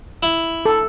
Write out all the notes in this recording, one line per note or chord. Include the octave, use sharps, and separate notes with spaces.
E4
A4